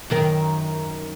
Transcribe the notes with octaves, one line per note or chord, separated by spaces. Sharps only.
F#2 D#3 A#4